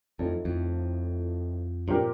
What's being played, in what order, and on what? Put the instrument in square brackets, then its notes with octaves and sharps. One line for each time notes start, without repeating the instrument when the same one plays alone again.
[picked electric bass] F2 [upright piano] A2 F3 C4 D#4 A4
[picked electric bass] F2
[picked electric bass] G2 [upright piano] A#2 F3 C4 G4 A#4